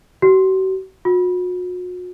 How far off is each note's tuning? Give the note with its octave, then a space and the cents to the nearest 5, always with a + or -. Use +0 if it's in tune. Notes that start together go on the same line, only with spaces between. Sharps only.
F#4 +45
F#4 -40